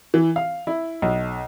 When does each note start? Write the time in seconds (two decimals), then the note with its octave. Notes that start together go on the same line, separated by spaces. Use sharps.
0.14 E3
0.36 F5
0.67 E4
1.02 B1